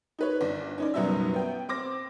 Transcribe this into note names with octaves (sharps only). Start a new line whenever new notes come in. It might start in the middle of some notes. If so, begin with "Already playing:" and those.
D#4 B4 C#5
G1 D5
C#4 D#4 D5
F#1 B2 F#3 G3 D#4 E5
B3 G5
C4 D6 A#6